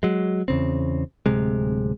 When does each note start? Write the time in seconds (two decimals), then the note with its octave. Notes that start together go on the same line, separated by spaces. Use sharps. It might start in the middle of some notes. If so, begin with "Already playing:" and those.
0.03 F#3 G#3
0.48 E2 C#3 C4
1.26 D1 C3 G#3